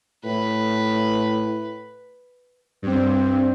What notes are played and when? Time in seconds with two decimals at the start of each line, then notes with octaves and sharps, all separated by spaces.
0.25 A2 B4
2.82 G2 C4